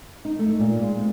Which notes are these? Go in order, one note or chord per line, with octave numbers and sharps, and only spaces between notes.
D#4
A3
A#2
G#3
C4